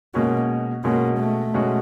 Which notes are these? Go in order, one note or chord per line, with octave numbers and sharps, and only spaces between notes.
B2 G#3 A#3 C#4 F#4
B2 G#3 A#3 C#4 F#4
A3
B2 G#3 C#4 F#4